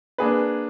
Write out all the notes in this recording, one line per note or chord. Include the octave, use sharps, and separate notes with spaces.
A#3 D4 G#4 B4